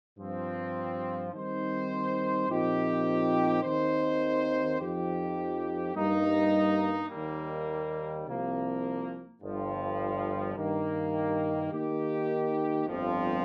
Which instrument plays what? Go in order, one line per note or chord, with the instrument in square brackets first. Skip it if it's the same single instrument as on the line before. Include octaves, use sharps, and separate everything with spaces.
[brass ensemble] G2 F3 C4
D#3 G3 C4 D#4 C5
A#2 F3 C4 D#4 G4
D#2 D#3 C4 D#4 C5
F2 F3 D#4 G4
G2 G3 A#3 D#4
D#2 D#3 G3 A#3
C2 C3 F3 A#3
G1 G2 F3
G2 D#3 A#3
D#3 A#3 D#4 G4
G1 F2 F3